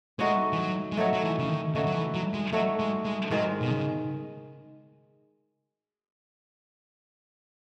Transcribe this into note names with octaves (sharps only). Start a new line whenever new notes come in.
G#3 A3 D#4 F#4 C#5
E3
F#3
G#3
F#3 A3 D#4 F#4 C#5
F#3
E3
C#3
D#3
C#3 A3 D#4 F#4 C#5
F#3
E3
F#3
G#3
F#3 A3 D#4 F#4 C#5
G#3
G#3
G#2 D#3 F#3 G#3
B2
C#3